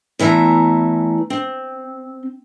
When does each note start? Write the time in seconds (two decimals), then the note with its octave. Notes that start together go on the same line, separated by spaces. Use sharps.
0.19 E2 E3 A3 A#5
1.30 C4